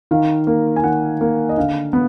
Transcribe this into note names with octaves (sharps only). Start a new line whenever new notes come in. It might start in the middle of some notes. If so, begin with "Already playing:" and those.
D#3 F5
A#3
G#5
D#3 F#5
A#3
D#5
D3 F5
B3